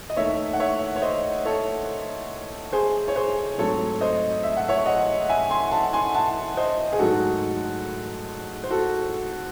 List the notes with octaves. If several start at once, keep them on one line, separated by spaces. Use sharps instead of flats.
D#5
D#2 D#3 A3 C#5 E5
F#5
C#5 E5
C#5
C5 D#5
A4 C#5
G#4 C5
C#5
G#4 C5
G#2 F#3 A3 C4 A4 C#5
C5 D#5
E5
F#5
C#5 E5
D#5 F#5
E5 G#5
G#5 C6
F#5 A5
G#5 C6
F#5 A5
C5 D#5
G#4
G#2 D#3 F#3 A3 D#4 F#4 A4
C5
F#4 A4